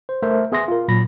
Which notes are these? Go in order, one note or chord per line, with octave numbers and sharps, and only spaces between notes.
C5
A3 A#4 C5 E5
B3 G#4 E5 C6 A#6
F4 A#4
A#2 F#3 B5 A#6